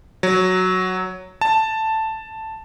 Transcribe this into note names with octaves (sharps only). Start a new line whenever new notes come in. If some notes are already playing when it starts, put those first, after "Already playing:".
F#3
A5